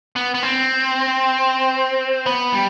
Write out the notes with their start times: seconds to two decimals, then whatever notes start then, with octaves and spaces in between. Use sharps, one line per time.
0.16 B3
0.34 B3
0.43 C4
2.26 B3
2.53 G3